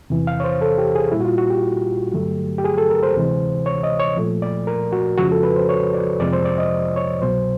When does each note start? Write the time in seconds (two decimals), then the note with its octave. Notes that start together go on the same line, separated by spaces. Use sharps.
0.10 E2 C3 E3
0.27 F5
0.40 C#5
0.44 C5
0.61 A4
0.78 G4
0.95 G#4
1.11 A#2 G3 E4
1.20 F#4
1.25 F4
1.38 F#4
1.50 G4
2.13 G2 D3 F#3 A3
2.58 G4
2.65 G#4
2.78 A4
2.90 A#4
3.03 C5
3.15 D2 C3 E3 G#3
3.66 C#5
3.83 D#5
4.00 C#5
4.17 A#2 F3 A3
4.42 D5
4.67 A#4
4.92 F#4
5.18 F2 C#3 F3 G#3 F#4
5.32 A4
5.43 B4
5.56 C5
5.69 C#5
5.94 D5
6.19 F2 C3 F3 G#3 D5
6.33 C5
6.45 D5
6.58 D#5
6.96 C#5
7.21 C2 B2 F#3 C5